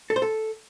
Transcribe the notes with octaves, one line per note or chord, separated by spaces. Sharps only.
A4
C5
A4